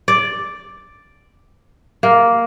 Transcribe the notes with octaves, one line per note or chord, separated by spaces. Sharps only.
D5
A#3